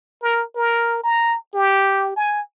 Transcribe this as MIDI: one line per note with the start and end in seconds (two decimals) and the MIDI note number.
0.23 0.43 70
0.56 1.03 70
1.04 1.37 82
1.54 2.13 67
2.16 2.41 80